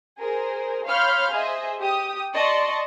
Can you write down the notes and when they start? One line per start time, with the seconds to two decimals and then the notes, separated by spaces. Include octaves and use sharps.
0.19 G#4 A#4 C5
0.86 C#5 F5 B5 C6 F6 G6
1.32 G#4 C5 D#5 E5
1.80 G4 D#6
2.33 D5 D#5 A5 C6 C#6